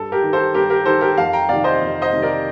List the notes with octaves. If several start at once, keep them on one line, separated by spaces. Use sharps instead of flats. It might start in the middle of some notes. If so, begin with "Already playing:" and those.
Already playing: G2 A4
G4 A#4
D#3
A4 C5
G2 G4 A#4
G4 A#4
D#3 A4 C5
G4 A#4
F2 F5 A5
G5 A#5
C3 D#3 D5 F5
C5 D#5
F2
C5 D#5
C3 D#3
A#4 D5